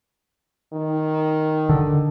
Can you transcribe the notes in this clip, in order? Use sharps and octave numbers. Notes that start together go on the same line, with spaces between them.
D#3
D3